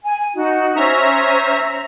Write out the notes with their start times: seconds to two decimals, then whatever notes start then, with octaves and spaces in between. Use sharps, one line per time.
0.03 G#5
0.34 D#4 F#4
0.76 C#4 C5 E5 A#5